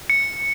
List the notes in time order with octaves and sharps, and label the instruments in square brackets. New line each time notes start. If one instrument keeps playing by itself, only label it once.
[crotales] C#7